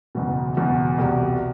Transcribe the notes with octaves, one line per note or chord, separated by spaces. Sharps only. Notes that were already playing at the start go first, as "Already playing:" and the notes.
F#1 E2 B2
F#1 E2 B2
C2 B2 G3